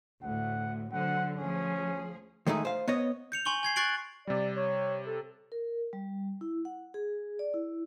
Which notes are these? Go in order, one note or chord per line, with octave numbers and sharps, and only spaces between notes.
D2 A2 F#5
D3 F#3 C5 F#5
D2 F3 C#4 G#4
D#3 G#3 A3 D#4 G#4
C5 F5
B3 C#5 D#5
G6 C#7 F7
G#5 C6 C#6 F#7 G7
G#5 G#6 C7
C#6 F#6 A6 C7 D7 F#7
C3 G3 D5
C#5
A4
A#4
G3
E4
F#5
G#4
D5
E4